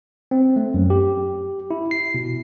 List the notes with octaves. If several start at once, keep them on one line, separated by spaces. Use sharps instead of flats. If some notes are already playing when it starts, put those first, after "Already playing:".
C4
A3
F#2
G4
E4
C7
B2